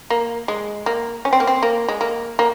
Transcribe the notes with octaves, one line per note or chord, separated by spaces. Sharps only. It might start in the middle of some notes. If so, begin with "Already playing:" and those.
A#3
G#3
A#3
C#4
C4
A#3
C4
A#3
G#3
A#3
A#3